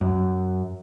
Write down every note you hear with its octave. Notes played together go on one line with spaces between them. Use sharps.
F#2